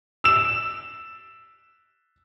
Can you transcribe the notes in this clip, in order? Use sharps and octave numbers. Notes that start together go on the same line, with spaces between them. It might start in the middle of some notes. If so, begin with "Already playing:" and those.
E6 E7